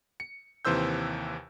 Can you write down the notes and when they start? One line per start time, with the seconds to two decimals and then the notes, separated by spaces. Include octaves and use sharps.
0.20 C#7
0.65 D#2 C3 E3 C5 E6 G6